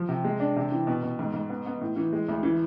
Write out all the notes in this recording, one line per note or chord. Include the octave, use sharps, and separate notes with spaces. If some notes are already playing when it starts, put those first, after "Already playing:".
Already playing: F3
C3
G#3
D4
C3
E3
B2
B2
G#2
G#2
B3
B3
A2
E3
G#3
D2
E3